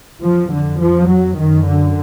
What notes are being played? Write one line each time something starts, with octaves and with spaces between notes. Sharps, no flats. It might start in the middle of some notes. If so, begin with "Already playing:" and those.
F2 F3
D3
F3
F#3
F#2 D#3
D3